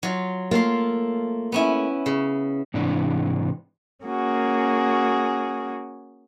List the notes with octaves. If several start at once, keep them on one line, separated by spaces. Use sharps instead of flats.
F#3 F4
A3 A#3 F4 C6
B3 C#4 E4
C#3
G#2 C3 E3 D4
A#3 C#4 F#4 G#4